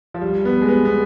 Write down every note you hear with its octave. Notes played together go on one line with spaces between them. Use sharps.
F3
G3
B3
G#3
B3
B3